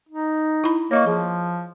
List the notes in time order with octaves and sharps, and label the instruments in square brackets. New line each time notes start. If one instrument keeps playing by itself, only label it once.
[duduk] D#4
[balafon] E4 B5
[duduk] A#3 [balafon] C#5 D#5 C#6
[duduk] F3 [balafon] G#4